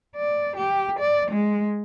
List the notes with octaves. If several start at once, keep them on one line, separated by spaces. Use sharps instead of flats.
D5
G4
D5
G#3